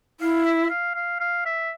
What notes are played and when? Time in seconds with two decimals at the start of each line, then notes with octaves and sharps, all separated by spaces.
0.20 E4 F5
0.45 E5
0.70 F5
0.95 F5
1.20 F5
1.45 E5